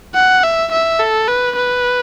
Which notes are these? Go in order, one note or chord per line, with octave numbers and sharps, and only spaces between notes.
F#5
E5
E5
A4
B4
B4